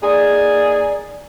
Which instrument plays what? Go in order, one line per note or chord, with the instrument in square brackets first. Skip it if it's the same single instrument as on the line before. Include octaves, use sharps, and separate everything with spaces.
[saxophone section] A#3 D#4 G#4 [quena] D5